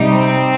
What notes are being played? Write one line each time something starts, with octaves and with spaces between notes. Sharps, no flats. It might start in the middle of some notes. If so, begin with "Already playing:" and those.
Already playing: C3 G3 D#4
C4 C5